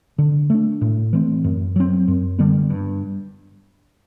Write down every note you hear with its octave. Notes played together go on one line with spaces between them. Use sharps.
D3
A3 D4
A2
E3 A3 C4
F#2
F#3 C4
F#2
D3 G3 B3
G2